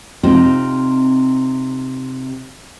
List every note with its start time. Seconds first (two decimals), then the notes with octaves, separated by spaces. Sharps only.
0.23 C3 C4 D#4 F4